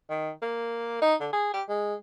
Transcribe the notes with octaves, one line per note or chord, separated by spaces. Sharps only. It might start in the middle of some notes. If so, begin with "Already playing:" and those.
D#3
A#3
D#4
D3
G#4
G4
G#3